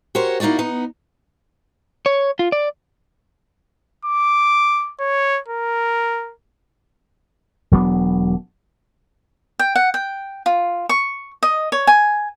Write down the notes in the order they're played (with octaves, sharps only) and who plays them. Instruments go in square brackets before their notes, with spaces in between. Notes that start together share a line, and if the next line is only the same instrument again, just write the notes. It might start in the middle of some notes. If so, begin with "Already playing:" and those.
[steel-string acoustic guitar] F#4 G4 A#4 C5 C#5
A#3 D#4 E4 F#4 D5
B3 D#4
[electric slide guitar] C#5
F4
D5
[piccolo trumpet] D6
C#5
A#4
[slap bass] E1 F#3 B3 D4
[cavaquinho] G5
F#5
G5
F4
C#6
D#5
C#5
G#5